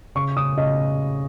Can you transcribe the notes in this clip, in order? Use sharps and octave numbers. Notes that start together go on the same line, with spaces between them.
C#3 C#6
C#3 D#6
C#3 D#5